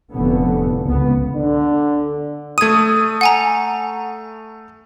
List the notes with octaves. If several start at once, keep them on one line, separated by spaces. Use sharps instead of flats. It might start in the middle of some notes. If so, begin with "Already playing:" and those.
F1 A2 D3 B3
C#2 B3
D3
A3 D#6 G#6 D#7
F#5 G#5 A#5